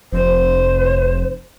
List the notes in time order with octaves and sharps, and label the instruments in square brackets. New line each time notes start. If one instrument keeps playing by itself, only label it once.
[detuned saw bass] F1 [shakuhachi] C5